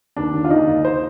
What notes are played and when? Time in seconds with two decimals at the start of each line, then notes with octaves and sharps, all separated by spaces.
0.17 D#2 D4
0.34 D#2
0.45 F4
0.50 D#2 D#4
0.68 D#2
0.85 C5